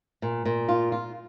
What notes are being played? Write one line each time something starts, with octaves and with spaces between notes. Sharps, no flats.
A#2
A#2
F4
F4